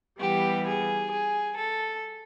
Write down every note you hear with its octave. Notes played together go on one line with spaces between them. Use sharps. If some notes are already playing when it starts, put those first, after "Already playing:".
E3 G3 B3 G4
G#4
G#4
A4